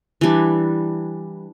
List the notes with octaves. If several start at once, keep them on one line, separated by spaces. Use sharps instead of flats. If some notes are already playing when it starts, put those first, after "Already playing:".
E3 G3 D4